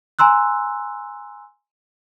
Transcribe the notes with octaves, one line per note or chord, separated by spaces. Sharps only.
G#5 A#5 C6 E6 F#6